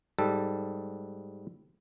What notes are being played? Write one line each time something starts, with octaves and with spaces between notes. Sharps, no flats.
G#2 G3 A4